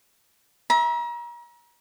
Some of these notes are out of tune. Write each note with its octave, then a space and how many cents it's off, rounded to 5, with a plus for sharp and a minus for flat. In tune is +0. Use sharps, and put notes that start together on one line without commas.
E5 -15 A#5 +35